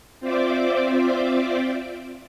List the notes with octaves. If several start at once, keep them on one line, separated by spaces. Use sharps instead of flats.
C4 F4 C5 D5 E5 D6